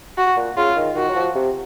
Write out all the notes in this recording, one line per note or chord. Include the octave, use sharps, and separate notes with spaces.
F#4
A#2
C#3 F4
D#3
D#3 F#4
F#3
F3
C3